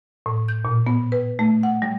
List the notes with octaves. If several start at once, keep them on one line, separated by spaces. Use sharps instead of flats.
A2
G6
A#2
B3
B4
A3
F#5
G3